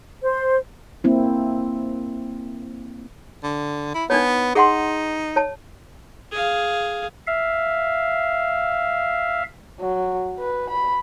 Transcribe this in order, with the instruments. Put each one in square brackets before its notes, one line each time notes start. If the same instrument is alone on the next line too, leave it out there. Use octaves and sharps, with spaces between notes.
[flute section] C5
[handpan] A#3 C4 E4
[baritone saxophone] D3
E4
[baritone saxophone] B3 [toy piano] D4 D#4 C#5
[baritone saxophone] D#4 [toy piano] G#4 F#5 C6
[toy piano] C#5 A5
[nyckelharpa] G#4 F5
[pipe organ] E5 F5
[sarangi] F#3
B4
B5